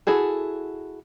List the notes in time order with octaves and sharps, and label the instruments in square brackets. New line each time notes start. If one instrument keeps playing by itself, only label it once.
[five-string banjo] E4 F#4 G#4 A4